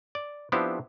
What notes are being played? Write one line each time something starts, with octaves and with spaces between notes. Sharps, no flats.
D5
F3 B3 C4 D4 E4 G4